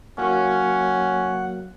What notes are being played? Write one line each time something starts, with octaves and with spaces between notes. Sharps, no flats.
F#3 A#3 C#4 F#5